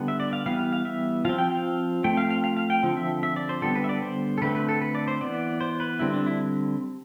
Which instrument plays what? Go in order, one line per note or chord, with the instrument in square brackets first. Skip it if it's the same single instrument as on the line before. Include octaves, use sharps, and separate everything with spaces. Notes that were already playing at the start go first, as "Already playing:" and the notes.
Already playing: [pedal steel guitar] D3 G3 B3
E5
D5
F5
E3 G3 B3 F5
F5
F5
E5
F3 C4 F5
G5
F5
F3 A3 C4 G5
F5
F5
F5
F5
G5
D3 F3 C4
E5
E5
D5
C5
D3 G3 B3 A4
B4
E5
D5
C5
A4
D3 A3 C4 B4
B4
A4
B4
D5
C5
E3 B3 D5
C5
B4
D3 G3 C4 E4
D4
E4